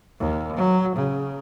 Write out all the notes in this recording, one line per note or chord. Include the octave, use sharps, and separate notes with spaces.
D#2
F#3
C#3